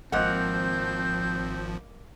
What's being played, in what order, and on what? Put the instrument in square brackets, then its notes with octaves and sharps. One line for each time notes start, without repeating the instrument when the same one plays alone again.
[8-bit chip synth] G#1 F3 [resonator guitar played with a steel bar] G#3 A#3 F#5 [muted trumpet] C4 [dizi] G6